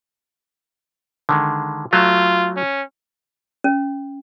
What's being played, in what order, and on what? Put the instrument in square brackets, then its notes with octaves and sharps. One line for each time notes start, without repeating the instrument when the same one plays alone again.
[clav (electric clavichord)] D3 D#3 G#3
[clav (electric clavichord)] F#3 A3 [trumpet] F4
[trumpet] C#4
[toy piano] C#4